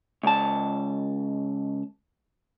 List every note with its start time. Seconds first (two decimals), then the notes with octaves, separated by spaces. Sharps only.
0.23 C#2 A5